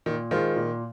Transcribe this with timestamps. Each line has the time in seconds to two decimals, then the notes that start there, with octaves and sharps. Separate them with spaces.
0.06 A#2 D#3
0.31 D#3 G#3 F4 C5
0.56 A#2